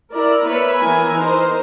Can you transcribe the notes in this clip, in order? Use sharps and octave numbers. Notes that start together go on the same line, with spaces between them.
E4 A#4 D5
B3 B4 C#5 E5
E3 B3 A#4 G#5
D#4 A#4 C5